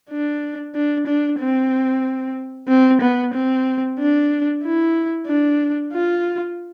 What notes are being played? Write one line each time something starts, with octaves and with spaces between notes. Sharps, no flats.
D4
D4
D4
C4
C4
B3
C4
D4
E4
D4
F4